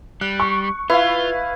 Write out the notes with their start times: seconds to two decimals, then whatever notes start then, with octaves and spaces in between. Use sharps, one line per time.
0.21 G3 F#6
0.40 C#6
0.90 E4 F4 B4 F5